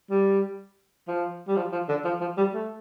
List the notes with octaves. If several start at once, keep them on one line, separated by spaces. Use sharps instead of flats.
G3
F3
G3
F3
F3
D3
F3
F3
G3
A3